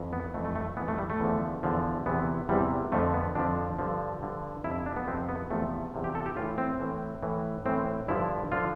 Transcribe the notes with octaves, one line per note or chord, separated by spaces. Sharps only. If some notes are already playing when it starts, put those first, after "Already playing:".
Already playing: F2 E3
B3
F2 E3 A3
A3
A3
F2 E3 B3
A3
G3
A3
E2 D3 F3
E2 D3 F3
E2 C3 E3 B3
E2 C3 E3 G3
F2 D3 F3 A3
B3
F2 D3 F3 D4
G2 D3 F3
G2 D3 F3
F2 C3 F3 E4
D4
B3
F2 C3 F3 C4
B3
E2 C3 F3 A3
E2 C3 F3
G4
A4
G4
A2 E3 F4
C4
A2 E3
A2 E3
A2 E3 C4
G2 D3 F3 E4
D3 F3 F4